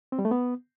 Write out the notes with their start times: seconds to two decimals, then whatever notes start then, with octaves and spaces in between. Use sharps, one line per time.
0.12 C4
0.19 G3
0.25 A3
0.31 B3